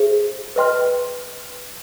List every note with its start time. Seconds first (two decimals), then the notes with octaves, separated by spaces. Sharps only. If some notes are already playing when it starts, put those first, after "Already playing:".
Already playing: G#4 C5 E5
0.56 B4 D#5 G5 C6 F6